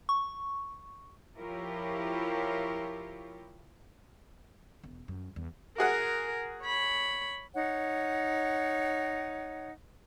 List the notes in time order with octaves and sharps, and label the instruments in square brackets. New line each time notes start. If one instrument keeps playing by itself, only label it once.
[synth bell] C#6
[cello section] F3 E4 F4 G4 A#4 C#5
[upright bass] E1
F#2
E2
[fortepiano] F#4 G#4 F#5 [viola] A#4
[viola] C#5 B5
[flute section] D#4 C#5 F#5